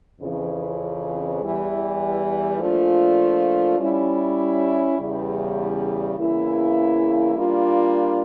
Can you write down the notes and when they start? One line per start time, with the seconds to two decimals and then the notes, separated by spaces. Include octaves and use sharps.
0.21 F2 C#3 E3
1.41 E2 E3 G3
2.59 A#2 F3 A3 D4 F4
3.79 G3 C#4 E4
4.98 E2 C#3 G3
6.17 E2 C#3 E3 A#3 E4
7.36 G3 A#3 D4 F4